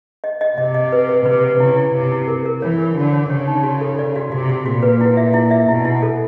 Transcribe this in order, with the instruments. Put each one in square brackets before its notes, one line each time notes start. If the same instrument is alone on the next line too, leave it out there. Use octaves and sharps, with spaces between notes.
[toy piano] D#5
D#5
[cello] C3 [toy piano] D#5
[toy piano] D#5
B4
B4
[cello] C3 [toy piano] B4
[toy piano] B4
[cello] C#3 [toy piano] E4
[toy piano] E4
[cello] C3 [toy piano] E4
[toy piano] E4
A#4
A#4
[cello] E3 [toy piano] C#5
[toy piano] A#4
[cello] D3 [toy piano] F#4
[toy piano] C#5
[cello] C#3 [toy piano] C#5
[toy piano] D#4
F#4
A4
D5
F#4
[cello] C3 [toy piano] F#4
[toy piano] F#4
[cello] A#2 [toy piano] F#4
[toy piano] B4
E4
E5
E4
E5
[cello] B2 [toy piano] E4
[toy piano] E4
A4